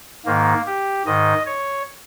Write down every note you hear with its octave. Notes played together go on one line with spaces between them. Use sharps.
G#2 D#3 A#3
G4
G#2 D#3 D#5
C#5